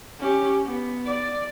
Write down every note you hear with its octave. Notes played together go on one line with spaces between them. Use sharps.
C#4 G4
B3
D5